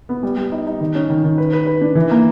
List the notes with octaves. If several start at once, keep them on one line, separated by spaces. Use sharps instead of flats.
B3
G3
G3
D#4
D#4
D#3
C#4
D#3
D#3
B4
B4
B4
D4
E3
A#3